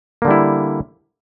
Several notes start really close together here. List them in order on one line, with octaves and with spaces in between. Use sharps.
A#3 D3 G3 E4